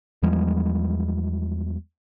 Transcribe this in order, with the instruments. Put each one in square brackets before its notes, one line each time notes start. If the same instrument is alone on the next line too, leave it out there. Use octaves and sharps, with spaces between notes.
[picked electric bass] E2 F3 G3 G#3